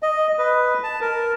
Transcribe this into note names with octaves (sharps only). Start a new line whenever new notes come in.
D#5
B4
A5
A#4